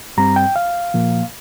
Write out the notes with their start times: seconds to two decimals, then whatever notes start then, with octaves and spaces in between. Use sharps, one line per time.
0.17 G2 G3 C4 A#5
0.36 G5
0.56 F5
0.94 A#2 F3 A#3